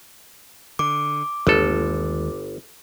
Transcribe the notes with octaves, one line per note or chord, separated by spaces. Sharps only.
D3 D6
G1 D#2 G#3 A4